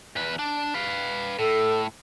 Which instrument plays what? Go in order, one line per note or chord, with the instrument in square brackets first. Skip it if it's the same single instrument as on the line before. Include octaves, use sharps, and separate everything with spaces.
[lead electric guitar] E2 B4
D4
B4 F5
[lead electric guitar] A2 [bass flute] A4